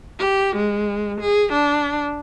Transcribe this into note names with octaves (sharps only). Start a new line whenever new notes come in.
G4
G#3
G#4
D4